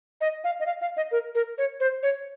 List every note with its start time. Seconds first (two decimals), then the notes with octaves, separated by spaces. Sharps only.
0.21 D#5
0.44 F5
0.60 D#5
0.66 F5
0.81 F5
0.97 D#5
1.12 A#4
1.35 A#4
1.58 C#5
1.80 C5
2.03 C#5